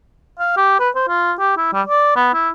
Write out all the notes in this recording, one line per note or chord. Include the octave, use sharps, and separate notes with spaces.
F5
G4
B4
C5
F4
G4
E4
G3
D5
B3
E4